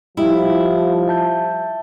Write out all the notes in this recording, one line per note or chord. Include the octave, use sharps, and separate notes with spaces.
F3 G3 E4 G4 D#5
E5 A5 G6